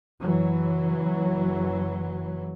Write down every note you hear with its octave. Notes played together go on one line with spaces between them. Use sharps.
F#1 E3 F#3